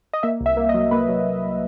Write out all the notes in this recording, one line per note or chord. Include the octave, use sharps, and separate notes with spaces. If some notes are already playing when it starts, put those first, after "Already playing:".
D#5
A#3 E5
C2
E5
A#3
D#5
F#3
A#3 B4
F#3